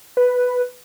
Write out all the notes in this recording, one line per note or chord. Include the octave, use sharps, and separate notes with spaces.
B4